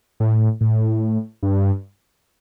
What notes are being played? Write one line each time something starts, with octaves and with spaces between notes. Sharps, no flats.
A2
A2
G2